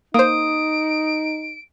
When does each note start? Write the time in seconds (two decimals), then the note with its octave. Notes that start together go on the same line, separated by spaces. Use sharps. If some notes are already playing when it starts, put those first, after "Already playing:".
0.14 A#3 D#4 C5 D#6 D7